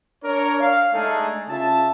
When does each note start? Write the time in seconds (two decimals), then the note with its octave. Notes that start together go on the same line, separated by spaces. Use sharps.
0.24 D4 A#4 C#5
0.61 F5
0.94 G#3 A3 D4 D#4 G#4 A4
1.49 C#3 F4 E5 A5